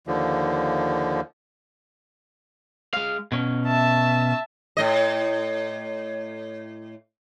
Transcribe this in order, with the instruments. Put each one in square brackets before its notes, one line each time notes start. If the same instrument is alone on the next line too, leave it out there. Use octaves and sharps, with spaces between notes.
[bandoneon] D#2 D3 F3
[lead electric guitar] G#3 F5
B2 C#4
[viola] E5 A5
[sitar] A2 D#5